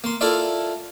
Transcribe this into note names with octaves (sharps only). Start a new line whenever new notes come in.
A#3 C6
E4 F4 A4 A#4 D5 E5